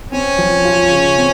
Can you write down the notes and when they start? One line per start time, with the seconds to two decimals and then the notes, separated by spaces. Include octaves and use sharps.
0.11 C4 C#4
0.38 F3
0.65 F4
0.91 C#3
1.18 C4